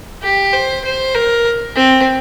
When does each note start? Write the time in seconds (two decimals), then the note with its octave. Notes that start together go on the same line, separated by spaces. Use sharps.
0.23 G4
0.53 C5
0.85 C5
1.14 A#4
1.76 C4